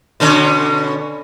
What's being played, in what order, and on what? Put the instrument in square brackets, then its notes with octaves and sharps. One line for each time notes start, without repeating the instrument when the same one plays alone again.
[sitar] B2 D3 C#4